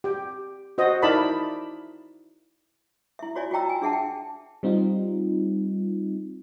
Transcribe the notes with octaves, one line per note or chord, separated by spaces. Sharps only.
G4 G5
F#4 C5 D#5
D#4 E4 A#4 D5 A5 B5
E4 E5
F4 F#4 C#5 D5 E5 G#5
F4 F#4 D#5 G5 A#5 E6
G#5
D4 G#4 E5 F#5 A5
G5
G3 C4 D#4 F4